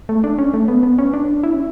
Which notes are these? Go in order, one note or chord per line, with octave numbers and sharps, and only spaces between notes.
A3
D4
C#4
A3
B3
B3
C#4
D4
E4
C#4